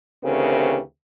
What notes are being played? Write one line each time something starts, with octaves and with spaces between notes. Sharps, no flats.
D2 C#3 E3 C4 G4 A#4